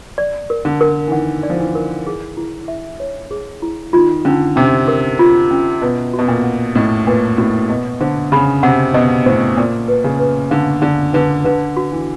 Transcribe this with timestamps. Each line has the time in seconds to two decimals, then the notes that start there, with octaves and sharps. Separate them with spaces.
0.18 D5
0.50 A#4
0.65 D3
0.81 A#4
1.08 E3
1.12 D#3 F#5
1.43 D5
1.50 F3
1.59 E3
1.75 A#4
2.06 G#4
2.37 E4
2.68 E5
3.00 C#5
3.31 G#4
3.62 E4
3.93 D#3 F4
4.25 D3 C#4
4.56 C3 C#4
4.88 A#4
5.19 F4
5.51 C#4
5.82 B2 B4
6.13 F#4
6.19 B2
6.28 A#2
6.44 F#5
6.75 A2 D#5
7.07 A#2 B4
7.38 A2 F#4
7.69 B2 D#5
8.00 D3 C5
8.32 C#3 B5
8.63 C3 F#5
8.94 B2 D#5
9.26 A2 C5
9.57 A#2 D5
9.88 B4
10.04 C#3
10.19 B4
10.51 D3 F5
10.82 D3 D5
11.13 D3 B4
11.44 D3 B4
11.77 F#4
11.92 E3